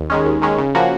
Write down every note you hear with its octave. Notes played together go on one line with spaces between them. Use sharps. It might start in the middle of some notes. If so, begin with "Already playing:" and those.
Already playing: D#2
D#3 G#3 C#4
D#2
D#3 G#3 C#4
C#3
F3 A#3 C#4 F#4